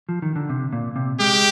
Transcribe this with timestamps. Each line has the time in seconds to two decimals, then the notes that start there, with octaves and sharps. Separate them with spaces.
0.09 F3
0.22 D#3
0.36 D3
0.49 C3
0.73 A#2
0.96 C3
1.20 G#3 G4